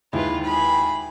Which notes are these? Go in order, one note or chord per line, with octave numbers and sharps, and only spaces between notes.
D#2 G#3 E4 F4 B4
G#4 B5